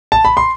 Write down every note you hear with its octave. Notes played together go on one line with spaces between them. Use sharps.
A5
B5
C6